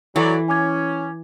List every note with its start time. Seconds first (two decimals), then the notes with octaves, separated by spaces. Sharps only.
0.16 E3 F#3 A4 D5
0.48 C#4 G#5 D6 G#6